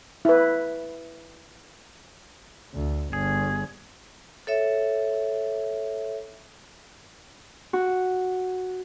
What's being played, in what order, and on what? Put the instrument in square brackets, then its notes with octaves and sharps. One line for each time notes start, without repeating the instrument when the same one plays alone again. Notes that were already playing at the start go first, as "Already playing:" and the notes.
[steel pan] E4 B4
[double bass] D2
[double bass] G1 [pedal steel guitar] G#4
[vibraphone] A4 C#5 E5
[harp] F#4